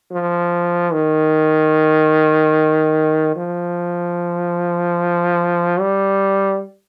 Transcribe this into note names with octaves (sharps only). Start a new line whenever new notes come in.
F3
D#3
F3
G3